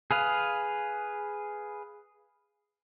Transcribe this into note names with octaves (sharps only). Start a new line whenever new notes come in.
G#4 B4 F5